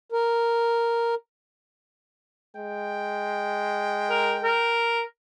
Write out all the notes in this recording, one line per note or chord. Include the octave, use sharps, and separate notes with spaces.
A#4
G#3 G5
A#4
A#4